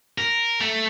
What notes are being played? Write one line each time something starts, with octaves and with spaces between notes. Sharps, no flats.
A#4
A3